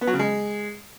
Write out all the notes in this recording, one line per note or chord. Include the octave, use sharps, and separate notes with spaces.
B3
F#3
C#3
G#3